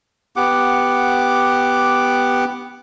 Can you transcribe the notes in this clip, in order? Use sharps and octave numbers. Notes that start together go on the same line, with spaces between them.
B3 G4 F#5 D6